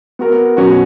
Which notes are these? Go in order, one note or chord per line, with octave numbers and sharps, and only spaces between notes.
B3 F#4 A#4
B2 F#3 C#4 F#4